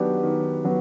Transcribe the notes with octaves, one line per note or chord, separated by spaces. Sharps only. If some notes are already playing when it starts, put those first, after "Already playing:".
Already playing: D#3 F#3 B3 D4 G4
D#3
F#3 B3